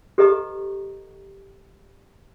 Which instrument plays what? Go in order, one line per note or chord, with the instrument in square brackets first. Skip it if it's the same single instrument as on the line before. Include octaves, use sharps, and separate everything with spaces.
[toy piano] G4 A4 B4 D#5 A#5 C#6